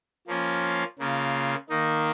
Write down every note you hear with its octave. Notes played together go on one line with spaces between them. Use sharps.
F3 A#3 C#4 F4
C#3 A#3 F4
D#3 A#3 D#4